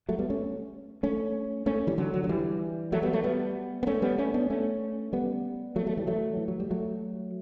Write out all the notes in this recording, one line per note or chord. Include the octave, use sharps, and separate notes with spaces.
F#3 A3
G3 B3
A3 C#4
A3 C#4
A3 C#4
E3 G3
D3 F#3
D3 F#3
F#3
E3 G3
F#3 A3
G3 B3
F#3 A3
G3 B3
B3
A3 C#4
G3 B3
A3 C#4
B3 D4
A3 C#4
G3 B3
F#3 A3
F#3 A3
E3 G3
F#3 A3
E3
F#3
G3
F#3 A3